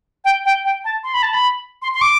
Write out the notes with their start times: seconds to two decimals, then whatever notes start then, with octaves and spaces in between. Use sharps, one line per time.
0.25 G5
0.45 G5
0.65 G5
0.85 A5
1.04 C6
1.14 B5
1.23 A5
1.33 B5
1.82 C6
1.94 C6
2.01 D6